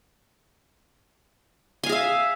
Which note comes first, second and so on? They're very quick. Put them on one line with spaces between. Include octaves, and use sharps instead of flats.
G#5 F5 G#4 E5